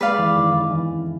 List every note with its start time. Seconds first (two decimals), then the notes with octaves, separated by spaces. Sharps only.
0.01 G#3 B4 D5 F5
0.18 E3
0.36 D#3
0.53 D#3
0.70 E3